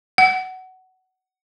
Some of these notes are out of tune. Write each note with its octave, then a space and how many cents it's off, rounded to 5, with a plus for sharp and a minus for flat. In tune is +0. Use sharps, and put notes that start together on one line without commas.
F#5 +15